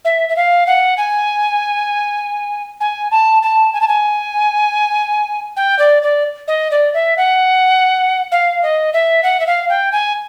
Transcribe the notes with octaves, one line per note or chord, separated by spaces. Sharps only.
E5
E5
F5
F#5
G#5
G#5
A5
A5
G#5
A5
G#5
G5
D5
D5
D#5
D5
E5
F#5
F5
D#5
E5
F#5
E5
F5
G5
G#5